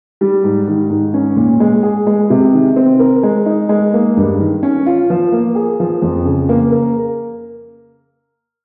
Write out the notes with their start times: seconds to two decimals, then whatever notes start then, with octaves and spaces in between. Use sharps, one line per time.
0.21 G3
0.44 G#2
0.68 D#3
0.90 G#2
1.14 C#4
1.36 A#2
1.60 G#3
1.83 G#4
2.07 G#3
2.30 C3
2.53 D#3
2.76 C4
2.99 A#4
3.23 G#3
3.46 D#4
3.69 G#3
3.94 A#3
4.17 G2
4.39 D#3
4.63 C#4
4.86 F4
5.10 F3
5.32 A#3
5.55 G#4
5.80 F3
6.02 F2
6.25 C#3
6.49 A#3
6.72 A#4